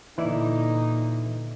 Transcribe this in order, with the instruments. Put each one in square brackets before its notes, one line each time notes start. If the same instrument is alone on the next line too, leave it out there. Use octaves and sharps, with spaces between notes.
[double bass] A#2 D3 [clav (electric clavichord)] E3 E4 D5 [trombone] D#4